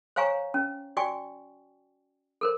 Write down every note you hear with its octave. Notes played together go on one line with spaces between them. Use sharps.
C5 C#5 F5 G#5 A#5 C#6
C#4
F#4 D5 G5 G#5 C#6
A4 A#4 C5